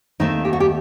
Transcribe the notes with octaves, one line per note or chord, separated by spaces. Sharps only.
D#2 D#3 A3 C4 D#4
G4
F#4
G4